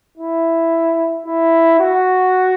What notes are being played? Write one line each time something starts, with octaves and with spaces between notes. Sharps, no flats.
E4
E4
F#4